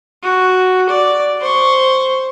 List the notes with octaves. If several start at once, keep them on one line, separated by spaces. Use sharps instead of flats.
F#4
D5
C5 C#6